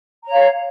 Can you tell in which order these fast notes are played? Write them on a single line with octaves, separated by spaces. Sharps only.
A#5 C#5 F5